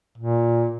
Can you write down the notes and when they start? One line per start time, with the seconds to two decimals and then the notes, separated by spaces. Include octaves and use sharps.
0.18 A#2